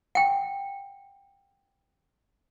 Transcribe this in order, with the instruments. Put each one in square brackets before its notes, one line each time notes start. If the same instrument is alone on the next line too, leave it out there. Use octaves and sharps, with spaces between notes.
[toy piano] F#5 G5